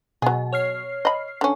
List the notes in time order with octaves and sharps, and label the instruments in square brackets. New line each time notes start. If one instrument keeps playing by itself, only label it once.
[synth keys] B2 [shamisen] F#3 G#4
[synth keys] C#5 F6 C7
[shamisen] D#5 B5
D3 C#4